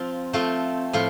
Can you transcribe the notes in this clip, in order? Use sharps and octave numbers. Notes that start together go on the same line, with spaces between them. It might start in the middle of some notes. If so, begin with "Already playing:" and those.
Already playing: F3 C4 F4
F3 A3 C4 F4
A2 F3 F4